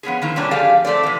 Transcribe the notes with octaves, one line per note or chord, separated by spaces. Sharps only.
F3 B3 C#4 G#4
D#3 A#3 C4 E4
C3 G3 A#3 C#4 D4
F3 A3 G4 G#4 D5 F5
F2 A3 C4 D5
C3 E3